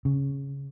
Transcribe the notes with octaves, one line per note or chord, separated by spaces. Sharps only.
C#3